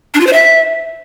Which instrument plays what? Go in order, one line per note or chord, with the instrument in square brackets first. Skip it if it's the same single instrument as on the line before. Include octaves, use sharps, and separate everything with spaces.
[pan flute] D4
F4
C5
E5